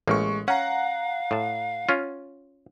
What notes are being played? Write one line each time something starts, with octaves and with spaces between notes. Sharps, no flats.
A1 G#3 A#3 C#6
C#4 F5 F#5 A#5
A2 A5
C#4 F4